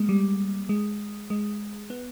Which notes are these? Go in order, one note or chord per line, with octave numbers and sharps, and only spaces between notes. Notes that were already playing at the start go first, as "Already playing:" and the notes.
Already playing: G#3 A#3
G3
G#3
G#3
B3